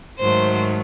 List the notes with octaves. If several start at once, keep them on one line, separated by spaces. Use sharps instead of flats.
G#2 D#3 F#3 A3 C5